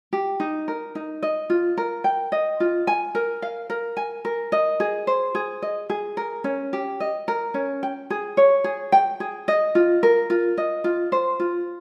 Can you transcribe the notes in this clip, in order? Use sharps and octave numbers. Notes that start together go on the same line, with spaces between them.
G4
D#4
A#4
D#4
D#5
F4
A#4
G5
D#5
F4
G#5
A#4
F5
A#4
G#5
A#4
D#5
G#4
C5
G#4
D#5
G#4
A#4
C#4
G4
D#5
A#4
C#4
G5
G#4
C#5
G#4
G5
G#4
D#5
F4
A#4
F4
D#5
F4
C5
F4